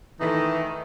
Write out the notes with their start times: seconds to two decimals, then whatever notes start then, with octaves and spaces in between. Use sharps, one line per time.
0.20 D#3 E3 A3 D#4